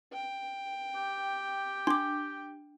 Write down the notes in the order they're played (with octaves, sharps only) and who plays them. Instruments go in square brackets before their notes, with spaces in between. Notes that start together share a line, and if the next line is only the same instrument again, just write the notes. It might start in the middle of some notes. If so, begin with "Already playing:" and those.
[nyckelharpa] G5
[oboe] G4
[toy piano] D4 [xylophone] C6 D6